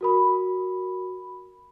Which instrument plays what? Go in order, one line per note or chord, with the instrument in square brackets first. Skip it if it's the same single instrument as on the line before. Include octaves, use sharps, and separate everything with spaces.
[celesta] F#4 A#4 B5